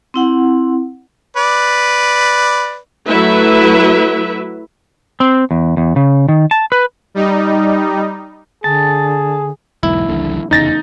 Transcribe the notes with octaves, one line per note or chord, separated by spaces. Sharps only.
C4 E4 F#5
B4 D5
F#3 A3 E4 B4 E5
C4
E2
E2
C#3
D#3
A5
B4
G3 D#4
D3 G#4 A5
B1 E2 G#2 E4
D#1 A#1 D3
F1 E2 C#3 D#4 A6 A#6